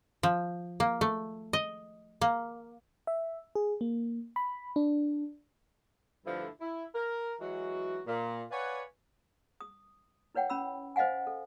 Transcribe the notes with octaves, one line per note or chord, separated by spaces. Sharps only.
F3
A#3
A3
D#5
A#3
E5
G#4
A#3
B5
D4
G2 D3 F3 A3 E4
E4
A#4
E3 F#3 G#3 F#4
A#2
B4 C#5 D5 F5 F#5 G#5
D#6
E4 B4 C#5 F#5 G5
C#4 B5 E6
C5 D#5 F5 F#5 G#5
A4